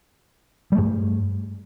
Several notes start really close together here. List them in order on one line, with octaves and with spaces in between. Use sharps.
G3 A3 G2